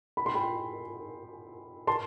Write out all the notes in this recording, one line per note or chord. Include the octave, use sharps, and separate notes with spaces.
B5
C6
G5 B5
A5 C6